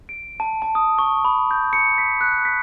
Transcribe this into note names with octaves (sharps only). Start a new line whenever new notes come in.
D7
A5
A5
D#6
C#6
B5
G6
C#7
B6
F#6
B6